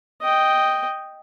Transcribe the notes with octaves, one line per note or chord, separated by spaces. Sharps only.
D#5 G5